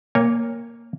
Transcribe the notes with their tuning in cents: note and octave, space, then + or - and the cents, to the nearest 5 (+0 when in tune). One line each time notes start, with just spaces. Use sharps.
A#3 +0 C#5 +0 G#5 -45